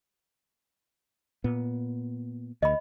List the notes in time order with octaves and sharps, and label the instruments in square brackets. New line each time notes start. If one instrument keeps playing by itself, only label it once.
[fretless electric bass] A#2 B3
[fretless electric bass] D2 [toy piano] D#5 B5